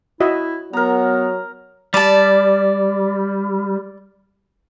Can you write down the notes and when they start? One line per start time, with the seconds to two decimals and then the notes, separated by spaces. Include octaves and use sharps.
0.20 E4 F#4 D#5 E5
0.73 F#3 B3 A#4 A#5
1.94 G3 D5 A5